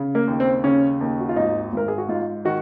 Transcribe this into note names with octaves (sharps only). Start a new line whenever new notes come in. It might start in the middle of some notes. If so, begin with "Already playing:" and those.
Already playing: C#3
A#3
D#2
C4
C#3 C#4
D#2
F#4
F4
G#1 D#4
G#1 A#4
G#4
F#4
G#2 F4
D#3 F#4